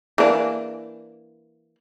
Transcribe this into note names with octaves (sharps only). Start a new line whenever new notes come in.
E3 A#3 D4